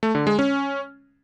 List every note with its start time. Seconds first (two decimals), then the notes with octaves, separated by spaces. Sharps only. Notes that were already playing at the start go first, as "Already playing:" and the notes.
0.03 A3
0.15 D3
0.27 G#3
0.39 C#4